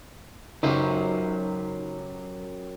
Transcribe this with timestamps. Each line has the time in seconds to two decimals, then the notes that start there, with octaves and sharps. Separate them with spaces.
0.63 C#2 F#2 F#3 D#4 G4 B4 C5